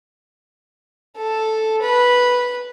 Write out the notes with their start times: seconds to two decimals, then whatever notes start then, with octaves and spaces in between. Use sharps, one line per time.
1.18 A4
1.82 B4